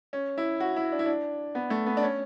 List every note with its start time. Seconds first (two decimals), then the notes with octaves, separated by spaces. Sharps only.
0.13 C#4
0.38 E4
0.60 F#4
0.76 E4
0.92 D4
0.99 E4
1.06 D4
1.55 B3
1.70 A3
1.86 B3
1.97 D4
2.03 C#4